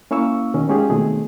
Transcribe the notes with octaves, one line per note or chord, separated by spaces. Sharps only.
A#3 C#4 E4 F5 C#6 E6
B2 D#3 C#4
G#3 C#4 F4 G4 G#4
B2 D#3 A3 C4 G#4